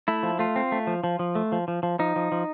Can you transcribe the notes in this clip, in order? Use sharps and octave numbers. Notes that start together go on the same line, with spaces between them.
A3 E4
F3
A3 F4
C4
A3
F3
F3
F3
A3
F3
F3
F3
F3 D#4
F3
F3